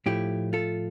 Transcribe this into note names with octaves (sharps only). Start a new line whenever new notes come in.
A2 F3 A3 E4 G4
F4 A4